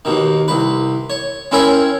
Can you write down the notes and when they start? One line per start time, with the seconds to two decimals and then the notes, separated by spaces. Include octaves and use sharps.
0.05 D#2 B2 D#3
0.48 C2 B4
1.10 C#5
1.51 C4 C#4 E4 G#4 A#4 C#5